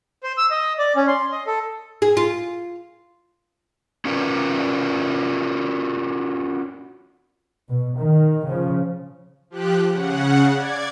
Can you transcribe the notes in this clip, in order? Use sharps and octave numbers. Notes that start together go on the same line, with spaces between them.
C5
E6
D#5
D5
C#4
C6
D#5
A4
G#4
F4
C#4 F4 F#4 A#4 B4 D5
B2
D#3
C#3 F3
F3 G4 F#6
C#3 F#5
D5 G#6